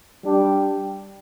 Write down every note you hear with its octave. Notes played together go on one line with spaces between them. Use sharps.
G3 D4 G4